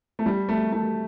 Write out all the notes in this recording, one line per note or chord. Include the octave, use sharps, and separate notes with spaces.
A3
G3
A3
A3